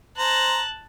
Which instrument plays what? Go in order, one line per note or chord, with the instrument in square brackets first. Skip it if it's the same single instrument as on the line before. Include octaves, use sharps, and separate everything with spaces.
[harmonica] C5 A#5 [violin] A5 F#6